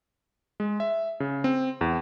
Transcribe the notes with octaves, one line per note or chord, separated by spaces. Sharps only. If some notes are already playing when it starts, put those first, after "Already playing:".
G#3
E5
C#3
C4
E2